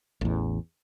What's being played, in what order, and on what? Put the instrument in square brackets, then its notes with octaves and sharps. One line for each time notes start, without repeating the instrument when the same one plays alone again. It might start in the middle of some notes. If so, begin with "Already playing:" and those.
[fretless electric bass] A1 E2